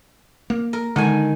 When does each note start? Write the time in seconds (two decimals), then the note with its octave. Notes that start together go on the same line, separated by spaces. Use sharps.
0.50 A#3
0.73 A#4
0.96 D3 D#3 G#3 D#4 G#5 A5